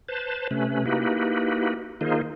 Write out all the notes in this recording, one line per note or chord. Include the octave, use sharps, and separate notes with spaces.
B4 C5 A5
C3 A3 C#4 B4
A#3 D#4 E4 F#4 G4 B4
D#3 A#3 D#4 F4 G#4 C5